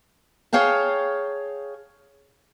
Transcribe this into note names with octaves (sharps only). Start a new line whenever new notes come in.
G#4 C#5 F5 G5 A5